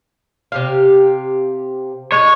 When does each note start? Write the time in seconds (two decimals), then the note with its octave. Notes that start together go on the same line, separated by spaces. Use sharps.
0.52 C3 G4 F5
2.12 G#3 D#4 C#5